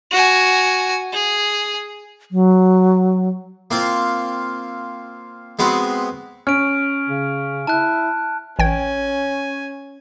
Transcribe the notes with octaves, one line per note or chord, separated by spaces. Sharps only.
F#4 G#5
G#4
F#3
A#3 C4 F4
G#3 B3 C4 F#4
C#4 F6 D7
C#3
E4 A5 F#6
A1 C#4 G5 G#5 G#6